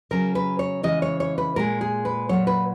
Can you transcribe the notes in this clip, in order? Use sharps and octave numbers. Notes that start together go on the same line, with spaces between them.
C#3 F#3 A#4
B4
C#5
C#3 E3 G#3 D#5
C#5
C#5
B4
A#2 G#3 A#4
G#4
B4
A#2 F#3 C#5
B4